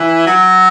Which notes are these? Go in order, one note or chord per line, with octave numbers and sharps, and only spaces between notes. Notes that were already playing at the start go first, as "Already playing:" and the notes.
Already playing: E3
F#3